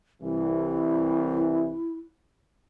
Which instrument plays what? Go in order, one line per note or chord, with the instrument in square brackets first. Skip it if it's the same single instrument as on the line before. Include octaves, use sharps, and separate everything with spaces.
[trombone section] C2 E3 [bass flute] E4